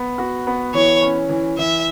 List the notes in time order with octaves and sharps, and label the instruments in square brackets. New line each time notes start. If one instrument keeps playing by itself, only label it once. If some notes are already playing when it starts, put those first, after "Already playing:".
Already playing: [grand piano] B3
F#4
B3
[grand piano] E3 [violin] C#5
[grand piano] C#4
E3
[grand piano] E3 [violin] E5